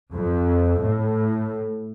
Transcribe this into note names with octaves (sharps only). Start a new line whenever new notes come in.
F2
A2